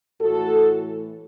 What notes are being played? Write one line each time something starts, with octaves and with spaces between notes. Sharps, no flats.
A2 E3 A3 F#4 A4